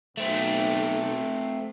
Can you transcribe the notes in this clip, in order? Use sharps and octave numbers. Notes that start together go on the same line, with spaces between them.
B1 A3 C4